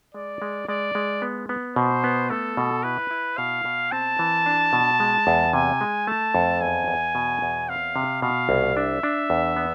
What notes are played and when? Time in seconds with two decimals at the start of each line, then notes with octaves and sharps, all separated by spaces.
0.14 G#3 D5
0.42 G#3
0.68 G#3 D5
0.95 G#3
1.22 B3
1.49 B3
1.76 B2 C5
2.04 B3
2.30 A3 A4
2.57 B2
2.83 E4 B4
3.11 E4
3.37 B2 F5
3.65 B2
3.92 C4 A5
4.19 E3
4.46 D4
4.73 B2
5.00 G#3
5.27 E2
5.53 C3 G#5
5.81 G#3
6.07 A3 A5
6.35 F2
6.61 E2 G#5
6.88 E2
7.15 B2
7.42 E2
7.69 C4 F5
7.96 C3
8.22 B2 F5
8.49 C2
8.76 D4 E5
9.03 D4
9.30 E2
9.56 B3